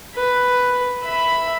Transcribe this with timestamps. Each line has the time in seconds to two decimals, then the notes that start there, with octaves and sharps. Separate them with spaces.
0.15 B4
1.03 E5 B5